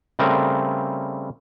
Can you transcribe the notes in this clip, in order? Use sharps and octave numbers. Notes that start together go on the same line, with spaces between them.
C#3 G3 A3 C4 A#4